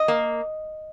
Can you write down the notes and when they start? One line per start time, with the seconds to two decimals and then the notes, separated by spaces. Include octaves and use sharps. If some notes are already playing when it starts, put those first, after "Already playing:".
Already playing: D#5
0.08 A#3